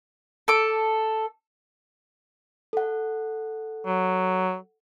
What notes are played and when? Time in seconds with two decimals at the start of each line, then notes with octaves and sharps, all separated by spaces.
0.48 A4 D6
2.73 A4 F#5
3.86 F#3